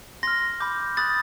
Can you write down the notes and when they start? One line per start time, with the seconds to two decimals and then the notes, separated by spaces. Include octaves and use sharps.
0.23 C6 F6 A#6
0.60 B5 D6 G6
0.97 B5 D#6 F#6 A6